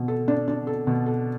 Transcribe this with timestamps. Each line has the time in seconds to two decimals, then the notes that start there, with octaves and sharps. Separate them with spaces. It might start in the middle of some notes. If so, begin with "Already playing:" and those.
Already playing: B2
0.08 A4
0.28 D4
0.48 D4
0.67 A4
0.87 B2
1.06 A4